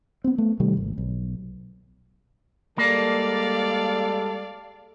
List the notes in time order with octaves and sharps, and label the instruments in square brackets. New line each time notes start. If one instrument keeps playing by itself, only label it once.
[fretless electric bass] B3 C4
A3 B3
C3 D#3 G3 A3
G#1
B1
[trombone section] G3 G#3 A4 [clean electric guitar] A#3 [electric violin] D5 F5